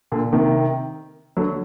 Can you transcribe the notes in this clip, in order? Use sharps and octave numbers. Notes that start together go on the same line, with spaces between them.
A#2 D3
C3 D#3
D3 F#3